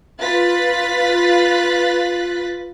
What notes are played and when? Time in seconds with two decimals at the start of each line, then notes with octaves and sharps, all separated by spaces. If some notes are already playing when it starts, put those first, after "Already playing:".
0.20 F4 B4 F#6 A6 B6